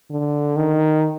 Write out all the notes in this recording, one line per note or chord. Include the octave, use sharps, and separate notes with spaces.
D3
D#3